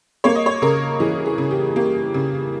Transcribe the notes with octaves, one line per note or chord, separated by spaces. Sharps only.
A#3 C#5
D#5
C#5
C#3 A#4
E3 G#4
G#4
C#3
G4
A#3 G4
C#3